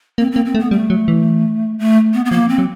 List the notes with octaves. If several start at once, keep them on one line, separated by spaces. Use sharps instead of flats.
A#3 C4
A#3 C4
C4
A3
B3
G3 A3
F#3
E3
A3
B3
B3
F3 A#3
C4
F#3